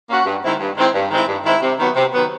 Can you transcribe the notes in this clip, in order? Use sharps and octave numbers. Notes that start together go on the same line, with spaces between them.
A#3 C#4 F#4
G2
D#3 G#3 C4 E4
G2
D#3 G#3 C4 E4
G2
D#3 G#3 C4 E4
G2
D#3 G#3 C4 E4
C3
D#3 F#3 B3
C3
D#3 F#3 B3